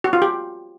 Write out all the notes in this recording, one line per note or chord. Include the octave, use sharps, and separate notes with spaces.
F#4
F4
G4